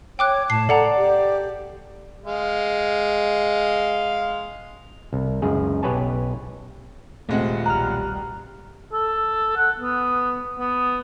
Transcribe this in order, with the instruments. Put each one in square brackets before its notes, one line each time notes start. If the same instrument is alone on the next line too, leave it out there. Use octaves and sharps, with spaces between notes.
[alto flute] C#5 [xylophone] G5 D6 F#6
[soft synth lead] A2 [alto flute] A5 [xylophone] C7
[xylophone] A4 F#5 A#5 [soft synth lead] D5
[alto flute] G4
[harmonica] G#3 F5
[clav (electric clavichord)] C2
C#2 F#2 G#4
B1 G4 B4 C#5 G#5 A5
[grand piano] D#1 G#3 F#5 [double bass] C3 [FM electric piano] A3 C4
[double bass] B1 G3 [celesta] A#5 [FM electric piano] F6 F#6
[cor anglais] A4
F#5
B3
B3